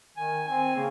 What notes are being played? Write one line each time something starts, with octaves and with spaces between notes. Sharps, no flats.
D#3 G#5
C4 G#5
C#3 A#3